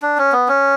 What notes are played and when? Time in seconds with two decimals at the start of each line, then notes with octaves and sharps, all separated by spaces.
0.02 D4
0.18 C#4
0.32 B3
0.48 C#4